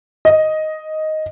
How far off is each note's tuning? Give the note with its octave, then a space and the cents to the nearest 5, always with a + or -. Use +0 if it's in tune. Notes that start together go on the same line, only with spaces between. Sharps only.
D#5 +5